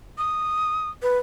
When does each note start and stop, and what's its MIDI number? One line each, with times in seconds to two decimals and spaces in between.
0.18 0.90 87
1.02 1.18 71